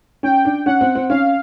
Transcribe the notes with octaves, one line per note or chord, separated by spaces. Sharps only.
C#4 G5
D4
C#4 F#5
C4
C4
C#4 F5